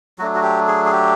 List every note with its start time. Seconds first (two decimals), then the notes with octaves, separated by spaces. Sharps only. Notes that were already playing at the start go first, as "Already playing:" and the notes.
0.19 F#3 A3 D4 F#4
0.35 F#4
0.43 G4
0.68 G#4
0.86 G#4
0.92 G4